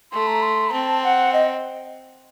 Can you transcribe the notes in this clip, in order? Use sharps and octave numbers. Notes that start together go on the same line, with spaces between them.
A3 C6
A#5
C6
C4 A5
F#5
D#5